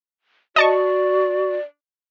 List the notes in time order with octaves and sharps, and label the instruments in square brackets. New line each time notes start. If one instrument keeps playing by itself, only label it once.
[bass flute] F#4 [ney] D5 [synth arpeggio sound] D#5 A5 C#6